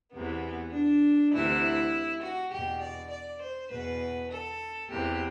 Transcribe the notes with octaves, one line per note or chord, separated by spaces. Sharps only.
E2 C3 E3 B3
D4
D2 C3 E3 E4
F#4
E2 B2 G4
D5
D5
C5
E2 B2 B4
A4
E2 C3 E3 G4